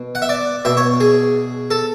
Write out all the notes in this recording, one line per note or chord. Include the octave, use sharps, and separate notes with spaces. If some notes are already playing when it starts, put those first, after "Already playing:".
Already playing: B2
F#5
E5
D5
B2 E5
C#5
G#4
A4